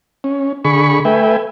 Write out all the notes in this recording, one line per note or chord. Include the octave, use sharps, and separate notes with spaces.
C#4
D3 G#4 B5 C#6
A3 B4 E5 G5 G#5